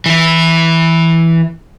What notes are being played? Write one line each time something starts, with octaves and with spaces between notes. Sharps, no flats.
E3 E4